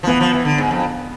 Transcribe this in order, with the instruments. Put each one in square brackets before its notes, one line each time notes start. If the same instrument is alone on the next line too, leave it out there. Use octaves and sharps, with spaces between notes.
[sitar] F3
[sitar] E3 [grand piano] B3
[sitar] F3
E3
D3
G#2
F2